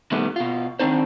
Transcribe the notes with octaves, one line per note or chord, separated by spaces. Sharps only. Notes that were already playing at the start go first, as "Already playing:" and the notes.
B2 D#3 G3 A3 B3
B2 F4
D#3 F3 C4 D4 D#4 C5